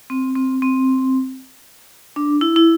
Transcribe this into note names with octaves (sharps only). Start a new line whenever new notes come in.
C4
C4
C4
D4
E4
E4